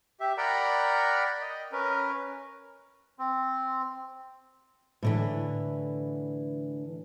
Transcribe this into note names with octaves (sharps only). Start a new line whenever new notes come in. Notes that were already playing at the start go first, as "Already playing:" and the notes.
G4 E5
A#4 D5 F#5 G5 A#5 B5
D#5
C#4 A#4 B4
C4
A2 D3 E3